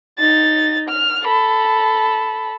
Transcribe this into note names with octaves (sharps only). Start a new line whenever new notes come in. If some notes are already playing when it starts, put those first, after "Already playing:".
D#4 A6
F6
A4 B5